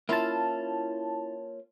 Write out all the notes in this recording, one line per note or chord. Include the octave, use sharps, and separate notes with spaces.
A#3 C#4 E4 F4 A5